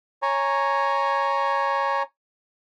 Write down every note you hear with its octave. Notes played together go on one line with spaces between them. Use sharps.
C#5 G#5 A#5